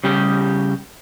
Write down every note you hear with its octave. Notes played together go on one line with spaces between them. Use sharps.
C#3 G3 G4